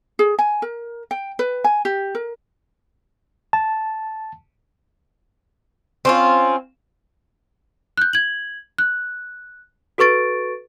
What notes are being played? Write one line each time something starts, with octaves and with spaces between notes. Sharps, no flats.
G#4
G#5
A#4
G5
B4
G#5
G4
A#4
A5
C4 C#4 F4
F#6 G6
G#6 F#7
F#6
F#4 A4 B4 C#6 A6 D7